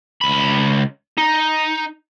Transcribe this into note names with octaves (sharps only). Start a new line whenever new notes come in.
C#2 B5
D#4